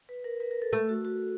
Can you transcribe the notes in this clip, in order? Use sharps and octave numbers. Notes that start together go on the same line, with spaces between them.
B4
A#4
B4
A#4
A4
A3
F#4
F#4